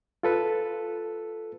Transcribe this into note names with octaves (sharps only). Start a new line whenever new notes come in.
F4 A4 B4